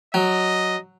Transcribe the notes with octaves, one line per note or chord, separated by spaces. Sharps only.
F#3 D#5